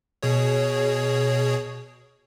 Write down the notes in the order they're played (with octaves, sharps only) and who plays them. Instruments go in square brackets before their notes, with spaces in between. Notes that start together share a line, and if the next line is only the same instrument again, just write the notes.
[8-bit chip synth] B2 G#4 C#5